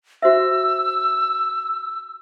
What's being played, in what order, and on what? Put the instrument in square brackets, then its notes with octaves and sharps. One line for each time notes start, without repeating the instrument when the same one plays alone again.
[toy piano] F#4 C5 E5 [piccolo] E6